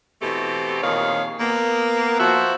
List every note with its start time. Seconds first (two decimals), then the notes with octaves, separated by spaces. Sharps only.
0.21 B2 E3 A3 C4 G4
0.82 F2 A#2 D#3 G#4 C#5 F5
1.40 A#3 B3
2.19 F3 F#4 E5